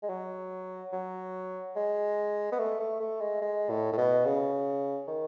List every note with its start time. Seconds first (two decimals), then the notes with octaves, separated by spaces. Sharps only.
0.03 G#3
0.09 F#3
0.93 F#3
1.76 G#3
2.52 B3
2.59 A3
2.80 A3
3.00 A3
3.21 G#3
3.42 G#3
3.70 A2
3.93 A2
3.98 B2
4.25 C#3
5.08 D#3